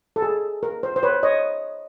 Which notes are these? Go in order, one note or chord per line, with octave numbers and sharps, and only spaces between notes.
A4
G#4
A#4
C5
C5
B4 C#5
C#5 D#5